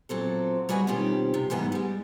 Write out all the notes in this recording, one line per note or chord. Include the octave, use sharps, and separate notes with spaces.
A#2 F#3 C4 A4
G3 F#4 G#4 B4 D#5
B2 D#3 C4 C#4 F4 G4
C3
G#2 E3 G3 G#3 B3 D#5
G3 G#3